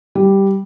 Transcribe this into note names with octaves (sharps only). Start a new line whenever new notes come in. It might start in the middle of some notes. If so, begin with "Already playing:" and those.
G3